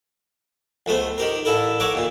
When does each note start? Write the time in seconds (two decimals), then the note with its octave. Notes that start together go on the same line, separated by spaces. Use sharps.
0.86 C#2 A3 B3 C5
1.18 D#3 G4 A#4
1.45 A1 E4 A4 A#4
1.80 A#4 C#5 E5 F#5 D6
1.94 D#2 A#2